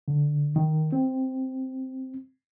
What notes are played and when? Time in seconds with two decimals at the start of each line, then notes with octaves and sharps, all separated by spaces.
0.08 D3
0.56 D#3
0.92 C4